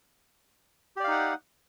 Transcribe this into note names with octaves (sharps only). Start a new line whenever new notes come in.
D#4 G4 D5 F5 F#5